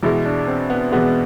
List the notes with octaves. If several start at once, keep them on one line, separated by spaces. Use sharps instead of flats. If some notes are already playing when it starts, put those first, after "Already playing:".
E2 B2 G#3 E4
D4
C4
B3
E2 B2 G#3 B3